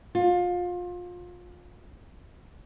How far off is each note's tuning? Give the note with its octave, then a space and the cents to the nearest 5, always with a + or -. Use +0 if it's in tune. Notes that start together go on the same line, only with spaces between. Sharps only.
F4 +25